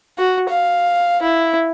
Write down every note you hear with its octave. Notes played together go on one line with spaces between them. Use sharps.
F#4
F5
E4